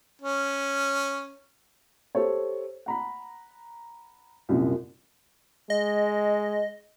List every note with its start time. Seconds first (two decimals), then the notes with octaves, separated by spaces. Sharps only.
0.22 C#4
2.15 G4 A4 C5 C#5
2.86 F#5 A#5 B5
4.49 C2 F#2 A#2
5.70 G#3 D#5